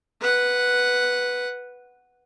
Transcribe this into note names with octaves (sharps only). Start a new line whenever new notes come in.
B4 F#5